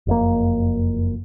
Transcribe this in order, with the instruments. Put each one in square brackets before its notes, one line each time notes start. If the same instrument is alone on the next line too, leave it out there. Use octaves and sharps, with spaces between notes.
[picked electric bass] F#1 F2 A#3